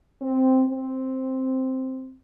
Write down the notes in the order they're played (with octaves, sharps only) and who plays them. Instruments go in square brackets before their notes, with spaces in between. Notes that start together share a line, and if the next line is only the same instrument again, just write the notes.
[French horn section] C4
C4